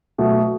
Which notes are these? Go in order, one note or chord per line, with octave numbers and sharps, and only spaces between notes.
B2 F#3 A3